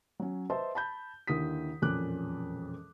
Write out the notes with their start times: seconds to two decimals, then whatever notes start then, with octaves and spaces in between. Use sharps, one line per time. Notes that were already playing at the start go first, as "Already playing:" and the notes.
0.20 F#3 C#4
0.50 B4 C5 D#5 E5 A5 C6
0.75 A5 B5 G6
1.27 D#2 D3 E4 D#6 B6
1.82 E1 F2 A#2 C#4 D6 F#6